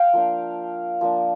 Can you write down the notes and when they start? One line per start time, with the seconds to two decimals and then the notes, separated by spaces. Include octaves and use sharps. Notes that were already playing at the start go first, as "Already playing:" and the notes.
Already playing: F5 G5
0.13 F3 A#3 D4
1.01 F3 A#3 D4